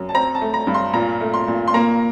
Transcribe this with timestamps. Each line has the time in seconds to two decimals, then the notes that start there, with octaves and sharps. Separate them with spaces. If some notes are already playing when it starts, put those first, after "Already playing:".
Already playing: F#2
0.09 A5
0.14 C4 A#5
0.35 A5
0.41 A3
0.54 A#5
0.67 G2
0.74 C6
0.94 A#2 A#5
1.21 A3
1.34 C6
1.48 A#2
1.68 C6
1.74 A#3 A#5